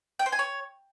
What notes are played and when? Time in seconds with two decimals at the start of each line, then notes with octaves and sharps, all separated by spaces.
0.19 G5
0.26 C5
0.32 G#5
0.39 C#5